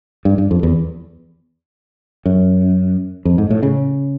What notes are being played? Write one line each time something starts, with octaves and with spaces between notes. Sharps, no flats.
G2
G2
F2
E2
F#2
F2
G#2
A2
C#3